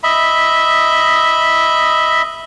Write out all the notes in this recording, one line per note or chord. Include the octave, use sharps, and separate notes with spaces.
D#5 E5 B5